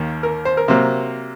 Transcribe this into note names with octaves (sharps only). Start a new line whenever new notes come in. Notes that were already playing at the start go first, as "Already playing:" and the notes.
Already playing: D#2 D#3 A#3
A#4
C5
A#4
C3 F#3 A#3 C5